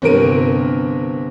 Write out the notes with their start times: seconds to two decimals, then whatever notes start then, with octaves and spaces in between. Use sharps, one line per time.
0.02 G1 C3 A#4 D7 D#7